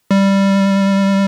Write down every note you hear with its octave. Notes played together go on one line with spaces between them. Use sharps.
G3